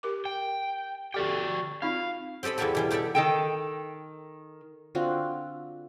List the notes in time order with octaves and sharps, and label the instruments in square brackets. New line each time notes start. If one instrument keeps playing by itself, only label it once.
[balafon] G4 A#4 D6
[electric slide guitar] G5
[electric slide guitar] F#4 D5 G5 [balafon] G4 A4
[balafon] C4 D#4 F4 [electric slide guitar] F5
[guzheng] C4 G4 A4 D#5 B5
E2 E3 A#3 B3 G4 A4
B2 E3 G3
D#4 G4 A4 D5 E5
[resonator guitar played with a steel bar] D#3 A4 G5
[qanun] D3 C4 F4 F#4